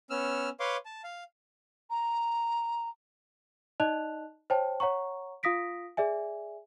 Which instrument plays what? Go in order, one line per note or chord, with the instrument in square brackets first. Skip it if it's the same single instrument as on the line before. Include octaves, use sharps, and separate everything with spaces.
[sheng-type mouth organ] B3 C#4 E6 F6
B4 C#5 F5 C6 D6
A5
F5
[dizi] A#5
[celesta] D#4 D5 D#5 A5 F#6 F7
C5 C#5 G5 A5
C#5 F#5 A#5 C#6
F4 F5 D#6 A#6 B6 D7
G#4 D5 E5 G#5